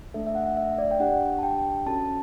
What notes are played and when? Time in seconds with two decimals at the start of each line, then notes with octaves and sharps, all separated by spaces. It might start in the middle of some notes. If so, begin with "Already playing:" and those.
0.14 A3 D4 A4 E5
0.27 E5
0.35 F#5
0.57 E5
0.78 D5
0.91 G5
1.00 D4 G4 F#5
1.39 A5
1.43 G5
1.86 C#4 F#4 A4 A5